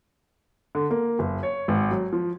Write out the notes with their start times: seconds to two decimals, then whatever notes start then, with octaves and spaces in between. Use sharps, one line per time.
0.75 D3
0.91 A#3
1.19 F#1
1.43 C#5
1.68 G#1
1.91 F#3
2.12 F3